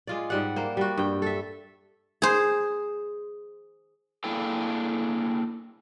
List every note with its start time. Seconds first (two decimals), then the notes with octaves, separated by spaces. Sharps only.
0.07 G#3 F4 D5
0.30 G#2 G3 F#5
0.56 A#3 C5
0.77 G3 F#4
0.98 G2 G5
1.22 A4 E5
2.22 G#4 C5
4.24 A#3 D4 E4 G#4 A4 G5